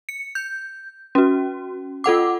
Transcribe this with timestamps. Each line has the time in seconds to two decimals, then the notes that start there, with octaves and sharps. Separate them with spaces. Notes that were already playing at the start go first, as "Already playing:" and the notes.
0.09 C#7
0.35 G6
1.15 C#4 F#4
2.04 F4 A4 F#5 D6